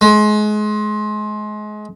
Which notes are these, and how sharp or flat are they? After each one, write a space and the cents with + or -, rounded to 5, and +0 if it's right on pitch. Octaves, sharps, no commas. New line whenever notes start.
G#3 +30